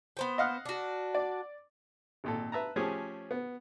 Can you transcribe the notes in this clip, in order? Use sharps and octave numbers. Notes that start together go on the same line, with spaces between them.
B3 C5 G5
D#5 F5 F#5
D4 F#4
D5
G#1 A#2 A4
B4 E5 A5 A#5
F3 A3 C#4 G4 G#4
B3